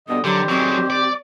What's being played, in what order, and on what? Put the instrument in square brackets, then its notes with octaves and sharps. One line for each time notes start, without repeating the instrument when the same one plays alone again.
[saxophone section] G2 B2 D3 [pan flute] B3 [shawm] D#5
[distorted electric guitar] D3 [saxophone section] D#3 G3 G4 [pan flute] F#3 [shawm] C5
[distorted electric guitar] F#3 G#3 [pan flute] C4
[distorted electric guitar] D5